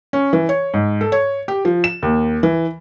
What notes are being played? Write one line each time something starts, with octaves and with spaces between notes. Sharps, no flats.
C#4
E3
C#5
G#2
A4
C#5
G4
F3
E7
D#2
E3